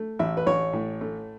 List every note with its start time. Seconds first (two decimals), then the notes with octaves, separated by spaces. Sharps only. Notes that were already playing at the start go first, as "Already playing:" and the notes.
Already playing: A3
0.19 A1 E5
0.37 B4
0.46 A1 C#5
0.73 A2
1.01 A3